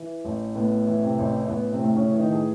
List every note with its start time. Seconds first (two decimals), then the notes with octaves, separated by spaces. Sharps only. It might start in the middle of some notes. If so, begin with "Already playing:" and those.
Already playing: E3
0.25 A1
0.55 A2 B3
0.86 E3
1.02 C3 C4
1.18 A1
1.48 A1 B3
1.72 C3 C4
1.80 A2
1.95 C#3 C#4
2.12 E3
2.19 D#3 D#4
2.32 G#4